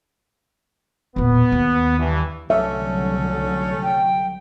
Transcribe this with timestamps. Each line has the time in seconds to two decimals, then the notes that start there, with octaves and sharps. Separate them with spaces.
1.16 E1 A#2 B3
1.52 D#2
1.99 G2 E3
2.50 C2 D3 F#3 A3 C#4 A4 E5
3.83 G5